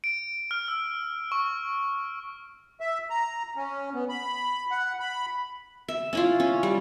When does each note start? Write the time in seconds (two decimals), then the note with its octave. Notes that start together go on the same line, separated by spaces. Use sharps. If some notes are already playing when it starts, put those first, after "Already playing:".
0.04 D7
0.51 F6
0.68 E6
1.32 C#6
2.81 E5
3.10 A#5
3.56 C#4
3.94 B3
4.09 B5
4.71 F#5
5.00 B5
5.88 E5
6.13 C#4 E4 F4
6.40 C#4
6.63 G3